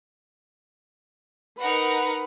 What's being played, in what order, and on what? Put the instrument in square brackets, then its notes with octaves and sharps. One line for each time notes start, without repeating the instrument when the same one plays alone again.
[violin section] D#4 A#4 F#5 [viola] B4